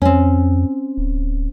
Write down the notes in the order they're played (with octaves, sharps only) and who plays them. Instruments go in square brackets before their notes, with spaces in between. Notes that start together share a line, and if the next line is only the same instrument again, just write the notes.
[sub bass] F2 [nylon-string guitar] C4 C#4
[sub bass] D1